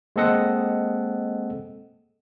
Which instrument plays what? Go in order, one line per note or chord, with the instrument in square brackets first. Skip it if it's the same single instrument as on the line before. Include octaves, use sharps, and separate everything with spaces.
[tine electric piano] G#3 A#3 C4 A4 D#5 F#5